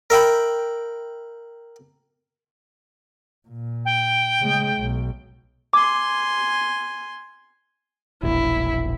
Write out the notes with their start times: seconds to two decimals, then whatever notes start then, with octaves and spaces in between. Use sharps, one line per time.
0.10 A#4 E5 G5 B5
3.48 A#2
3.85 G5
4.40 C#3 G#3
4.78 B1
5.73 G#5 C6 D6
8.23 E1 A#1 E4